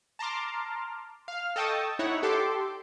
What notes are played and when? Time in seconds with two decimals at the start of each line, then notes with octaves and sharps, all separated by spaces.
0.19 A5 A#5 C6 D6 F6
1.28 F5 F6
1.56 A4 D#5 G5 A5 C#6 D#6
1.99 D#4 E4 C#5 F#5
2.23 G4 A4 C6 D6